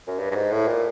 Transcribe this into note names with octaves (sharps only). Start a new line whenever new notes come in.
F#2
G2
G2
G#2
A2
A#2